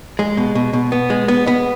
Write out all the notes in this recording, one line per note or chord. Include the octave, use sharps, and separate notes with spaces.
G#3
B2
B2
B2
B3
G#3
B3
B3